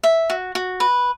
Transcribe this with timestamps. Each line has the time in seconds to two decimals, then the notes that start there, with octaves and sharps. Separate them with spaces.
0.03 E5
0.30 F#4
0.55 F#4
0.80 B4